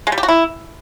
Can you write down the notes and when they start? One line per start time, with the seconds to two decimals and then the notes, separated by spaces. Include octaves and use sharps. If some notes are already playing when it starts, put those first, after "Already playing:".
0.07 G#3
0.12 G3
0.18 G4
0.23 F#4
0.28 E4